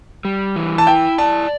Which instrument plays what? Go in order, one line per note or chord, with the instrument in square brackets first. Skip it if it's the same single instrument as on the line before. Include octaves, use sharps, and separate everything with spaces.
[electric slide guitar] G3
E3
[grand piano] A5
[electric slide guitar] E4 [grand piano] G5
[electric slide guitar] D5 [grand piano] A5